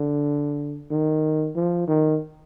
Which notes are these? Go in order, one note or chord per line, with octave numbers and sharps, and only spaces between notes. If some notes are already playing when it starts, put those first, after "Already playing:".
Already playing: D3
D#3
F3
D#3